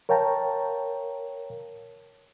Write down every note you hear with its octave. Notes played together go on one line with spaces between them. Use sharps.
A#4 C#5 F5 G5 A5 A#5